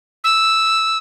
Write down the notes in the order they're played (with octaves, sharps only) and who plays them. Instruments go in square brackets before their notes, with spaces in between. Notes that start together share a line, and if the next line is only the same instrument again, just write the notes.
[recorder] E6